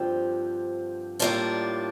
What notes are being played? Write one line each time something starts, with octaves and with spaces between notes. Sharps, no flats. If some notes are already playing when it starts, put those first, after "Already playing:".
Already playing: G2 D3 F3 C4 G4
A2 G3 A#3 D4 F4